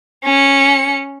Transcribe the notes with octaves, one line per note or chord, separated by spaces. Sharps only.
C#4 C#7